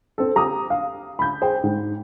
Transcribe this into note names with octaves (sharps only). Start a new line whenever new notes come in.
C4 A4
G4 A#5 D6 D#6
F5
B5 G6
G#4 C5 G5
G#2